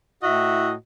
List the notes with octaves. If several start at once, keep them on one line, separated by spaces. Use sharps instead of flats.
A2 E4 F#4 D#5 E5